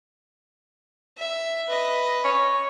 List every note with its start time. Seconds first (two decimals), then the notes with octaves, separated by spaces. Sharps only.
1.18 E5
1.67 B4 D#5
2.25 C#5